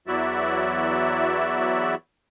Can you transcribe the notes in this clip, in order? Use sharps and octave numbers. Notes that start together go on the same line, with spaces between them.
E2 F#3 E4 F#4 D5 E5